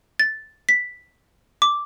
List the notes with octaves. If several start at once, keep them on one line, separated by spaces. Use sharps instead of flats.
A6
B6
D6